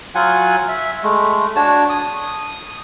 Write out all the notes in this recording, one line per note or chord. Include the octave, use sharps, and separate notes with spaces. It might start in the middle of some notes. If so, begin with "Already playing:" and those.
F#3 F4 F#5 G#5
E5
G#3 A3
D4 F#4 C#5 A5
D#6